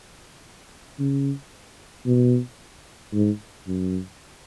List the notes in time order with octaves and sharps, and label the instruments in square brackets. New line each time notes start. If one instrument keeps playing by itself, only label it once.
[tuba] C#3
B2
G#2
F#2